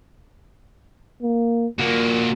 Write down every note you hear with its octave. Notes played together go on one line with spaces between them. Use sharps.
A#3
A#2 A#3 F#4